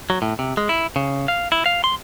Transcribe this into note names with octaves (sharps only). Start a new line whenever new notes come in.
F#3
A2
C3
G#3
E4
C#3
F5
E4
F5
C6